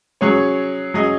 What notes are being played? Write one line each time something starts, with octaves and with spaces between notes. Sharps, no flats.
F#3 C#4 G#4 C#5
F#3 C#4 G#4 D#5